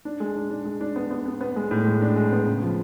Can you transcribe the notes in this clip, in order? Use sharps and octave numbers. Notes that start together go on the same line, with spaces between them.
D4
G#3
D4
D4
G#3
D4
B3
B3
B3
B3
G#3
A2
G#3
D4
G#3
B3
C#3
F3